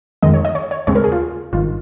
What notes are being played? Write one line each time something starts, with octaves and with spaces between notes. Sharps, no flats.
F2 D#3 G#3 D#5
C#5
D#5
C#5
C#5
D#2 C#3 G#3 C4 C#5
A#4
G#4
F4
G#1 G2 D#3 F4